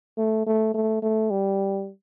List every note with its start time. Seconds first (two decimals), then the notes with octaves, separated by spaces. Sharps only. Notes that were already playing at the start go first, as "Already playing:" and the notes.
0.17 A3
0.46 A3
0.74 A3
1.02 A3
1.30 G3